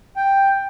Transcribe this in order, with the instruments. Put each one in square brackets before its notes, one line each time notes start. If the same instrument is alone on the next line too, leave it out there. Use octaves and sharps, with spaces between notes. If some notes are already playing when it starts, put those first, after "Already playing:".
[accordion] G5